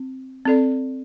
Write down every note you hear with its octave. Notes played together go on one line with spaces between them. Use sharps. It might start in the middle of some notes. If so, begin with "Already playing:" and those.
Already playing: C4
C4 A4 D5